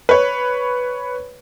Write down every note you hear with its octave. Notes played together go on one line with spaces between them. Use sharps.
B4 C#5